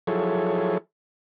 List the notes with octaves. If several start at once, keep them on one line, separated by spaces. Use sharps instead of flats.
F3 F#3 E4 G#4 A4 C#5